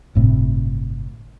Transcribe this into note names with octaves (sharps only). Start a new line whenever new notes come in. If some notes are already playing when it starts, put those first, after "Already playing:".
G1 A2 C3